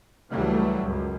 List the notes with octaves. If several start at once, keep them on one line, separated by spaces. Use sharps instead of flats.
C#2 E3 F#3 G3 A3
C#2 F#2